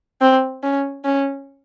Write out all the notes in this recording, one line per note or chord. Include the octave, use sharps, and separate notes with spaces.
C4
C#4
C#4